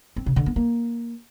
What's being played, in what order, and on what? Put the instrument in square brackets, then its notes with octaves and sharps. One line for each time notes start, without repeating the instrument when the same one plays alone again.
[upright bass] C4
C#3
D3
B3
A#3